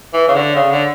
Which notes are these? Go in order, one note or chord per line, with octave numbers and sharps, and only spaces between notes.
E3
C#3
D3
C#3
D3